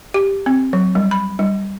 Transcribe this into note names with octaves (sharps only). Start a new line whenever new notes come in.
G4
C4
F#3
G3
B5
G3